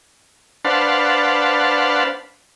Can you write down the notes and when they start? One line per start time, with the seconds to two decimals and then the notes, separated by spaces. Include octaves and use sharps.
0.65 D4 B4 C5 F5 F#5 A5